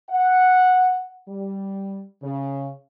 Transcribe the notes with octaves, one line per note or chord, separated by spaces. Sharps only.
F#5
G3
C#3